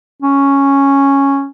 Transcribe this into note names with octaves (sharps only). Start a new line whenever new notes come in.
C#4